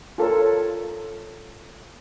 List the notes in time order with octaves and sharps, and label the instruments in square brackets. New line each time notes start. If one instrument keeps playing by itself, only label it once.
[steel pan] F4 A4 A#4 C#5